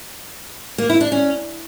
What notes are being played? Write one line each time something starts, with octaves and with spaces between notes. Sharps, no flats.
A#3
E4
D4
C#4